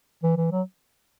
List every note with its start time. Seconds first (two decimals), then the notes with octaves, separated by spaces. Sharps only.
0.23 E3
0.37 E3
0.52 F#3